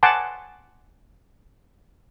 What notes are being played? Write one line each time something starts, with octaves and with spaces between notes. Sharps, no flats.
F#5 G#5 A5 C6 D6